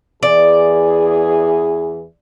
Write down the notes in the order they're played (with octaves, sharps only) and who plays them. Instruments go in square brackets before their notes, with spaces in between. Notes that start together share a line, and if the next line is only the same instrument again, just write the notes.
[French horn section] E2 E3 G#4 [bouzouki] D5